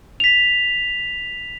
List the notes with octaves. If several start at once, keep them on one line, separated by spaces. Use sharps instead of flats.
B6 F7